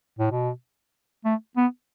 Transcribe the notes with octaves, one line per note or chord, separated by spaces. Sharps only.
A2
B2
A3
B3